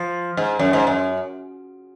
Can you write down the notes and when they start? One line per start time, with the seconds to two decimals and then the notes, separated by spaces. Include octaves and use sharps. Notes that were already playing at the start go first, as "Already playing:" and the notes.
Already playing: F3
0.37 G#2
0.59 F#2
0.73 G#2
0.87 F#2